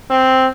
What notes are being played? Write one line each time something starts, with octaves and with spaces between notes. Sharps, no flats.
C4